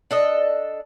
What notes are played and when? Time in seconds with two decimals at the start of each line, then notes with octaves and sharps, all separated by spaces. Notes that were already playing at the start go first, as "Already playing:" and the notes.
0.11 D4 A4 D#5